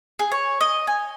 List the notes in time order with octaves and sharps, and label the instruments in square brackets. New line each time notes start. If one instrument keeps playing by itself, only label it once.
[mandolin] G#4
C#5
D#5
G#5